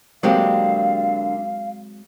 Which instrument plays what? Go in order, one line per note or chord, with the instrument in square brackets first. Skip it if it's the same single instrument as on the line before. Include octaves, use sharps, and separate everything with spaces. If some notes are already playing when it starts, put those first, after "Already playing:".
[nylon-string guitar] D3 A#3 G4 [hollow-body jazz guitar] F#3 G#3 C4 [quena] F5